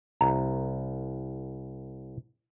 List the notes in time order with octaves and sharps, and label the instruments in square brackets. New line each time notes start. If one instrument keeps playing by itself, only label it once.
[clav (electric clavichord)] C2 [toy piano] A#5